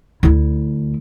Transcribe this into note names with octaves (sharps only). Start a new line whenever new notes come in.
D2 E4